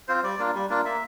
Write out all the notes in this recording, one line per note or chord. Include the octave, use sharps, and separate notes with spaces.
C4 F4 C5
G3 D5
A#3 D4 F4
G3
A#3 D4 F4
A#3 E5